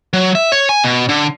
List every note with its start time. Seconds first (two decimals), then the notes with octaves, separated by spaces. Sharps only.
0.13 F#3
0.35 E5
0.52 C#5
0.69 G#5
0.84 B2
1.09 D3